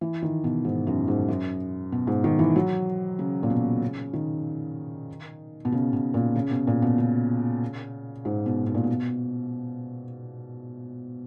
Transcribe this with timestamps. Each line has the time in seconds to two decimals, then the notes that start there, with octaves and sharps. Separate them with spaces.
0.01 E3
0.22 D#3
0.44 B2
0.65 G#2
0.87 F#2
1.08 G#2
1.28 F#2
1.92 B2
2.07 G#2
2.24 D#3
2.39 E3
2.56 F#3
3.19 C#3
3.43 A#2
3.50 B2
3.82 C#3
4.13 D#3
5.65 B2
5.72 C#3
5.93 B2
6.14 A#2
6.36 C#3
6.51 B2
6.67 A#2
6.82 B2
6.98 C#3
8.25 G#2
8.46 B2
8.67 B2
8.75 A#2
8.84 B2